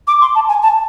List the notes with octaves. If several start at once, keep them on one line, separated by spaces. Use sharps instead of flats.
D6
C6
A5
G#5
A5